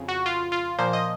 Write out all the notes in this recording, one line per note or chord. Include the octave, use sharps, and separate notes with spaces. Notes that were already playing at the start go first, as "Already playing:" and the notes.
Already playing: F2 C#3
F#4
F4
F4
A#2 F3 A#3 C5
D#5